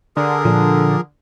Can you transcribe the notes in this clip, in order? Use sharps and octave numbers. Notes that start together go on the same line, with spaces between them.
D3 G#4 A#4
A#2 F3